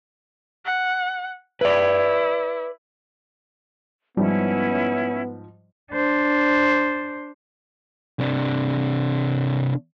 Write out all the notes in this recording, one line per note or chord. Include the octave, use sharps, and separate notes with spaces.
F#5
E4 B4 D5
G#2 F3 G3 B3 C#4 E4
D4 C5
C3 D4